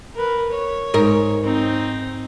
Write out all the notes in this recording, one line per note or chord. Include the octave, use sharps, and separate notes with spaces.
A#4 B4
C#5
G#2 A#4
C4 D#4